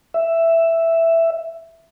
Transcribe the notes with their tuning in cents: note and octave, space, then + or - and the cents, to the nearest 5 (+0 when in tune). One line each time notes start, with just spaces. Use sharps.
E5 +5